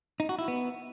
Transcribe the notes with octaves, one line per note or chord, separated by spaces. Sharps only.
D#4
F#4
E4
B3